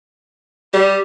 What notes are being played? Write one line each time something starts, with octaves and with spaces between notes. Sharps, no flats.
G3 G4